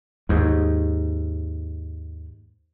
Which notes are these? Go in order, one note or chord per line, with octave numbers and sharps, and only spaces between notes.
D#2 G#2